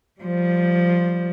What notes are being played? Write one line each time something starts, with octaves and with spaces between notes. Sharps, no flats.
F3 G3